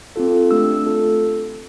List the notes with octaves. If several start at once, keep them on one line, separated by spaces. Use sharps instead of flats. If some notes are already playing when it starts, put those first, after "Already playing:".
C4 F4 A4
A3 D4 G4 E6
A3 C4 F4 A4